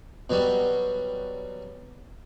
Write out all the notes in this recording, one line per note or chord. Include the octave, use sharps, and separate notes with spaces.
B2 F#3 G3